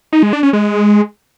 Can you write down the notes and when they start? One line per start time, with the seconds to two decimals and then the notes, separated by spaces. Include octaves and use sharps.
0.13 D#4
0.23 G#3
0.33 D4
0.43 C#4
0.53 G#3